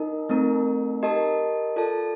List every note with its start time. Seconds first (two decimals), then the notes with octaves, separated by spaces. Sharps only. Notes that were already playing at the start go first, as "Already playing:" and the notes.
Already playing: D#4 A#4 D#5
0.29 A3 C4 D#4 A#4
1.03 G4 A#4 D#5 A5
1.76 F4 A4 D5 A5